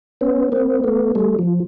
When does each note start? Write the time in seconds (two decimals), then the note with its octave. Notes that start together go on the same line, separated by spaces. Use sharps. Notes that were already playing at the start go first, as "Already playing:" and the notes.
0.21 B3 C#4
0.52 A#3 C4
0.84 A3 B3
1.15 G3 A3
1.39 F3